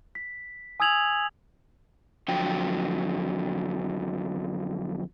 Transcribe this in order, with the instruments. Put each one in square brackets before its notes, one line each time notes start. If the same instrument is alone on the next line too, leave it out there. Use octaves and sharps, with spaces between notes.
[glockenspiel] B6
G#5 D#6 E6 G#6 F7 F#7
[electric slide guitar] F2 D3 F#3 G5